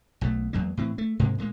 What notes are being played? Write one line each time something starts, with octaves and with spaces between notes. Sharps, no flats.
B1 B2 E3 A3
E2 F#3 G#3 A#3
A2 E3 C4
A3
G#2 C3 G#3 A#3
A#2 G3 G#3 A#3